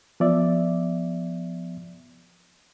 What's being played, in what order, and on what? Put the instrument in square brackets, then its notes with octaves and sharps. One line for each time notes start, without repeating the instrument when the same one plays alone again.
[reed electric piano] F3 B3 D5 E5